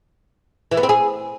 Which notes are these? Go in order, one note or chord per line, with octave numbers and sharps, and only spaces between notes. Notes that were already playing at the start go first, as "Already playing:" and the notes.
E3
B3
C4
G#4